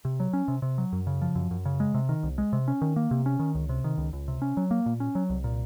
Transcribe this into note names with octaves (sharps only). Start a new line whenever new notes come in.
C3
F#3
C#4
C3
C3
F#3
F#2
C#3
F3
F#2
F#2
C#3
G#3
C3
D#3
C2
G#3
C3
C#4
D#3
A#3
C3
C#4
D#3
C#2
C3
D#3
C#2
C#2
C3
C#4
F#3
A#3
A#2
C#4
F#3
C2
A#2